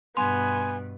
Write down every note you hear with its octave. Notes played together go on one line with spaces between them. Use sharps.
G2 B2 B3 G#5 C6